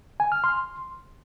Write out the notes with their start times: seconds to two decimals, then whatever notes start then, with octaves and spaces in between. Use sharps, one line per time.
0.20 G#5
0.32 F6
0.44 C6